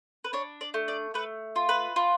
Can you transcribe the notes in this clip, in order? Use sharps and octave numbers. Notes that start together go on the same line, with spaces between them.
B4
D4 C#5
D5
A3
D5
A3 B4
F4
B4
F4